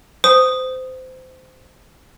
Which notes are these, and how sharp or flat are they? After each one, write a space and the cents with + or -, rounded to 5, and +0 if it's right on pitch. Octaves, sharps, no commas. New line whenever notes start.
C5 -25 D#6 -5